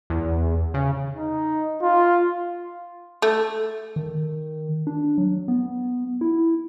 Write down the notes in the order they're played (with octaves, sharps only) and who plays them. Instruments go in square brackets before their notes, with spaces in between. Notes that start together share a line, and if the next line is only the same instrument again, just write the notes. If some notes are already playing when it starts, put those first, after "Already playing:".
[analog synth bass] E2
C#3
[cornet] D#4
F4
[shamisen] A3
[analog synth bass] D#3
D4
F#3
B3
E4